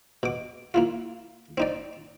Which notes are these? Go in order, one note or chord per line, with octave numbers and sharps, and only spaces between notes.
B2 D6
A#3 E4 F4
C4 D#4 D5